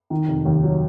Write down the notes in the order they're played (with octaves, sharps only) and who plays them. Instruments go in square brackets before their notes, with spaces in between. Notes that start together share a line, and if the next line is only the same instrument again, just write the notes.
[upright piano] D#3
F1
D#2
F#3